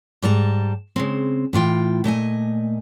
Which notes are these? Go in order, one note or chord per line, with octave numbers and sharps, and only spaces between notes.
G#2 G3 A5 A#5
C#3 G#3 C4
A2 E3 F4 G5
A#2 A3 D#5 G#5